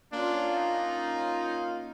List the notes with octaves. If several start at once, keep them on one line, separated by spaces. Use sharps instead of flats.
A#3 C#4 D4 F4
D#4